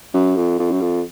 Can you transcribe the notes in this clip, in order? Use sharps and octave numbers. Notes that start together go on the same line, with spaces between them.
F#2
F2
F2
F#2
F2